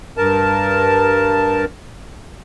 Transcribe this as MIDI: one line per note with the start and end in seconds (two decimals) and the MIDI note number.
0.17 1.65 43
0.17 1.65 70
0.17 1.65 81